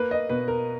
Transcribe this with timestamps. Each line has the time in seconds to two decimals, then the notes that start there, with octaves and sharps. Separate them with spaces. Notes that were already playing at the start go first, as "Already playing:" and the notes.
Already playing: A#3 B4
0.11 D#5
0.29 B2 B4
0.48 A#4